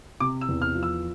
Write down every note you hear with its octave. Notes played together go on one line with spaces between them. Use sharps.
C3 D6
E6
E2
F6
F3
E6